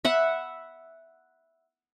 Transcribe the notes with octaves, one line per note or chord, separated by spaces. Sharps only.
E5 F#5 B5